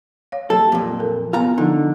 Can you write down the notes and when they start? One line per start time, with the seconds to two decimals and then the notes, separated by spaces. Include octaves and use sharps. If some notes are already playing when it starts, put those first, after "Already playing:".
0.32 C#5 F5
0.50 F#3 A#3 G4 A4
0.72 F2 A#2 F4
0.99 A4 A#4
1.33 B3 F4 A#5
1.58 D3 F3 D#4